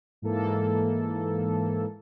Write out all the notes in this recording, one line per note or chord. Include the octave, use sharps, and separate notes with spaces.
G#2 E3 A#3 A4